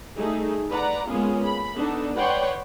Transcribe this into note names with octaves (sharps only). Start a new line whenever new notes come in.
G3 A3 D#4 G#4
B4 D5 F#5 A#5
G#3 A#3 B3 C#4 F4 G#4
B5
B3 D4 D#4 A4
B4 C#5 D5 F#5 G5 C6